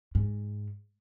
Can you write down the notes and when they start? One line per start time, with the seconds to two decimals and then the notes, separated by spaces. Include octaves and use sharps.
0.15 G#2